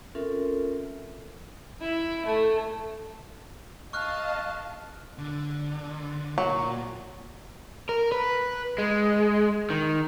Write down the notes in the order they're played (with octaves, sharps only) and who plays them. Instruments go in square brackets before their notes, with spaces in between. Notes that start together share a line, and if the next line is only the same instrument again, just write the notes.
[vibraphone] C4 C#4 F4 A4 A#4 E5
[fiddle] E4
A3
[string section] D#5 F5 A5 [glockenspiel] C#6 F6 F#6
[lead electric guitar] D3
[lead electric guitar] A#2 [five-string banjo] F#3
[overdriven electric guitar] A#4
B4
G#3
D#3